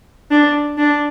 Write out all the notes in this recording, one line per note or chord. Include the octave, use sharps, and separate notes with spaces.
D4
D4